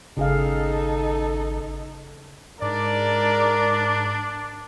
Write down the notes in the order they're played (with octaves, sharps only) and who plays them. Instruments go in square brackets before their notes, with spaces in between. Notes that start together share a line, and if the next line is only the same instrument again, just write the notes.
[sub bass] G#1 [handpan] C#3 G#4 F5 [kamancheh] D#4 A4
[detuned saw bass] G#2 [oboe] D4 [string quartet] A#4 [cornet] D5